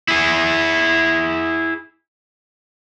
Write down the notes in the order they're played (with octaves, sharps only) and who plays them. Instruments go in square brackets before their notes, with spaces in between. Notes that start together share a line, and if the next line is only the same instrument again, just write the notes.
[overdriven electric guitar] E4 G#4